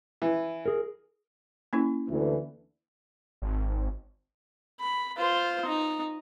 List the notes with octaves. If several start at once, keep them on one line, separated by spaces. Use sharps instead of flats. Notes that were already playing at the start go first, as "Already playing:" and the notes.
E3
G#4 A#4
A#3 C#4 E4
D2 E3
G#1
B5
F4 C5
D#4